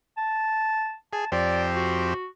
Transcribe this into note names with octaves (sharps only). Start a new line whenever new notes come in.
A5
G#4 A5
F2 C4 G4 D5
F#4